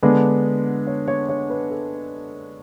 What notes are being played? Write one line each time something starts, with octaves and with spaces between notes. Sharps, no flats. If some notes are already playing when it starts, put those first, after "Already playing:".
D3 G#3 B3 D4 B4
C#5
C#5
C#5
B4
A4